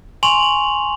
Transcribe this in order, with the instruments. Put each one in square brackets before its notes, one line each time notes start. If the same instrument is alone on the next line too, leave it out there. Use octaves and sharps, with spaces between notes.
[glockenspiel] G#5 C6 C#6 F7 F#7